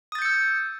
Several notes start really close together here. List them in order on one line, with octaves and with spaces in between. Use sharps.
D#6 A6 G6 C#7 E6